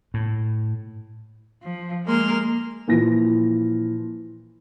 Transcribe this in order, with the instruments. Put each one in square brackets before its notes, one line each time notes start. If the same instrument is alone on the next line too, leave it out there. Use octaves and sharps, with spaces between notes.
[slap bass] A2
[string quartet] F3
G#3 A#3 C6 F6
[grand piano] A#2 E3 F3 A#6